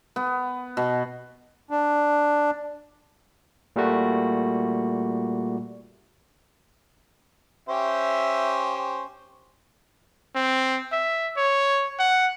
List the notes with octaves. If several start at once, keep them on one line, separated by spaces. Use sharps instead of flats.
B3
B2
D4
A#2 G3 A3 F#4
C#4 G4 C5 E5
C4
E5
C#5
F#5